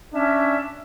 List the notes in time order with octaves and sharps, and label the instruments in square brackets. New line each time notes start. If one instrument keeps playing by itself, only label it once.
[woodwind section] C#4 E5 [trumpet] D4